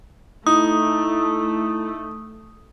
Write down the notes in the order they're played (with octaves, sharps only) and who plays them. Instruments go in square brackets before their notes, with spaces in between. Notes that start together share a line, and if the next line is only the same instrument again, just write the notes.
[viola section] A3 [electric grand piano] D#4 [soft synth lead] E4 [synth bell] D#6